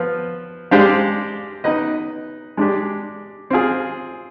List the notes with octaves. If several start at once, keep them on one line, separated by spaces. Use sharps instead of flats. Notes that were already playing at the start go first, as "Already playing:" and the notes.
Already playing: F3 B3 F4 B4
G#3 D4 G4 C5 F5
B3 D#4 B4 D#5
G#3 D4 G4
C4 F4 G#4